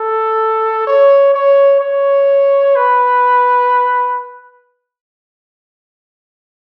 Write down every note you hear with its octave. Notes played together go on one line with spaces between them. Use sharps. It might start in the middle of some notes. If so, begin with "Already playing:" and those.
Already playing: A4
C#5
C#5
C#5
B4